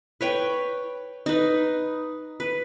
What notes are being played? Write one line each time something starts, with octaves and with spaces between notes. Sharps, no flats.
B4 C#5 G5
D#4 B4
B4